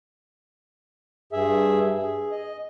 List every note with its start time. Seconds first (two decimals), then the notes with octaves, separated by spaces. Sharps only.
1.32 G2 G#4 E5
1.98 G#4
2.31 D#5